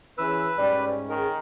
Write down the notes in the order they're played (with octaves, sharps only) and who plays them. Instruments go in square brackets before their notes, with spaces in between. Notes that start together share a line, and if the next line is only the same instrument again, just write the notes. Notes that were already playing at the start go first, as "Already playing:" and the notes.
[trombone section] E3 C#4 G#4 [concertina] B4 [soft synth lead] E6
[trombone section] G#2 C#4 [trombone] G3 [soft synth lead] D5
[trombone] D#3 [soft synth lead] G#4 [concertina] A#4